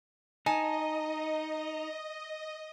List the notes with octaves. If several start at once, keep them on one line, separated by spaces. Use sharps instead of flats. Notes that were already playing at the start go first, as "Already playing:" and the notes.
D#4 D#5 G#5 A5